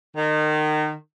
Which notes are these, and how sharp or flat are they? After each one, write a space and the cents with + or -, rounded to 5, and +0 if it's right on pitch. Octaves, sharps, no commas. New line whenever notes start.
D#3 -30